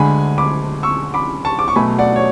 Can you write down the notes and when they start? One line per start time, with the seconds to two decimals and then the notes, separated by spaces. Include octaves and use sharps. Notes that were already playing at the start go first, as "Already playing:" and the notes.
Already playing: D2 D3 G#3 G#5 B5
0.38 B5 D6
0.83 C#6 E6
1.14 B5 D6
1.45 A5 C#6
1.59 D6
1.68 C#6
1.76 B2 F#3 A3 G#5 B5
1.98 D5 F#5
2.16 C#5